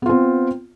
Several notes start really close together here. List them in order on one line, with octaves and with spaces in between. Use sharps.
B3 F4 C4